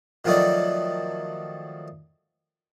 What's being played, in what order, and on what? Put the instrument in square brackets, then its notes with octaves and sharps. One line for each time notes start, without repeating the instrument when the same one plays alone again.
[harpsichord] D#3 F3 F#3 A3 D#4 D5